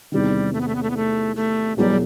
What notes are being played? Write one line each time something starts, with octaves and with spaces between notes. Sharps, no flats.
E2 C3 D#3 G3
A3
B3
A3
B3
A3
B3
A3
A3
E1 E2 B2 F#3 G3